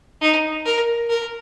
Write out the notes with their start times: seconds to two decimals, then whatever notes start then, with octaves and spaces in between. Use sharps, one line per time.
0.21 D#4
0.65 A#4
1.09 A#4